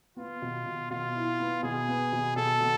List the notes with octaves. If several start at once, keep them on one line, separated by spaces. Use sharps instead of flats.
B3 F4
B2
B2
B2 F4
E4
B3
B2 G#4
B3
B2
B2 A4
B2